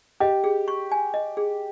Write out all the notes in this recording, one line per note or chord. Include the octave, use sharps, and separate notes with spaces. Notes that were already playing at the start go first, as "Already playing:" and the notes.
G4 D#5
G#4
C#6
G#5
D#5
G#4